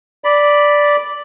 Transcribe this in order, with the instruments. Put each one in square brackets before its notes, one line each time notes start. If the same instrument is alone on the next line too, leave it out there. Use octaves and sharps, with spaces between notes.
[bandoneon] D5 B5